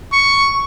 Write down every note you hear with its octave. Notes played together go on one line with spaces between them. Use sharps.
C#6